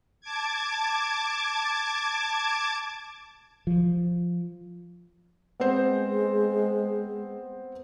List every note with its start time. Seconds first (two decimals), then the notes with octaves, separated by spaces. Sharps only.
0.21 A5 D6 G#6
3.67 F3
5.60 G#3 B3 C4 C5